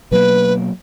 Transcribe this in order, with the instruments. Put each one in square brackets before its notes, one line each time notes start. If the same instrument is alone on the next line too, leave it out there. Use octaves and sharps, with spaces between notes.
[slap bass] B2 F#3 A#3 [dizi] B4